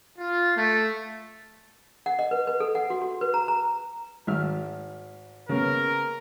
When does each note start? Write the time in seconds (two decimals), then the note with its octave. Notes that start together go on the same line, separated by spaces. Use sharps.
0.18 F4
0.54 A3
2.06 F#5
2.19 D#5
2.31 B4
2.47 B4
2.60 A4
2.75 F#5
2.90 F#4
3.02 F#4
3.21 B4
3.34 A#5
3.48 A#5
4.27 G#1 E5 F6
5.49 C#3 A#3 B3 A#4